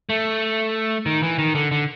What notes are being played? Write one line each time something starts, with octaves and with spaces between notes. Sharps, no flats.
A3
D#3
E3
D#3
D3
D3